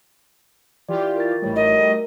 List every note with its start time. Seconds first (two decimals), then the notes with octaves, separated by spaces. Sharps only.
0.89 E3 F4 G4 D5
1.16 A#4 C#6 A6
1.42 A1 E3 G3 A3 C#5
1.56 D#4 F#4 A#4 D#5
1.76 G3 A3 A#4